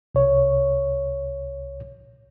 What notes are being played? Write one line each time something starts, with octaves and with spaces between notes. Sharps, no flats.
C2 C#5